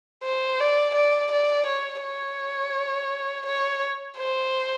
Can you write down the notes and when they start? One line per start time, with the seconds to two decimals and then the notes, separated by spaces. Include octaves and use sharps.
0.24 C5
0.61 D5
0.95 D5
1.32 D5
1.67 C#5
2.02 C#5
3.47 C#5
4.18 C5